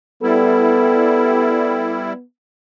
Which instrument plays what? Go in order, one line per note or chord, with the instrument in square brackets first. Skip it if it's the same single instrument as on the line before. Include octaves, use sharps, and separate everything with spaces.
[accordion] G3 E4 [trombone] B3 [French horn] A4